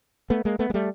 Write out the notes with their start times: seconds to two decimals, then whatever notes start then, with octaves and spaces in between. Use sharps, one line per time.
0.30 A3 B3
0.45 G#3 A#3
0.59 A3 B3
0.70 G#3
0.74 G3 A3